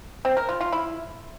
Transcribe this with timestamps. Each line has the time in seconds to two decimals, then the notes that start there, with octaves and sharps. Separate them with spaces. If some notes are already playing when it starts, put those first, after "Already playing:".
0.25 C4
0.37 A#4
0.49 F4
0.61 F4
0.72 E4